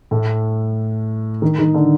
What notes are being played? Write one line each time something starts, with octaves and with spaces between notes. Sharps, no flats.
A2 A3
D#3 D#4
D#3 D#4
D3 D4